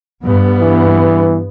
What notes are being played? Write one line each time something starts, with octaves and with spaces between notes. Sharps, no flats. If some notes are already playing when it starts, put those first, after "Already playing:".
G2 B3
E3